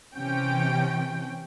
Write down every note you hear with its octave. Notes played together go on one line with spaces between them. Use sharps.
C3 E3 C#4 G5